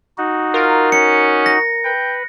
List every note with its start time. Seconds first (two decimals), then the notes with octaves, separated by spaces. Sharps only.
0.18 D#4 F#4
0.54 F4 A#4
0.92 C#4 C#7
1.46 A#6
1.84 B4 G5